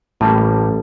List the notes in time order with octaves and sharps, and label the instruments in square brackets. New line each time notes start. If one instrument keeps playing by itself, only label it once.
[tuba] A1 [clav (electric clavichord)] A2 G3 A#3 [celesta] A5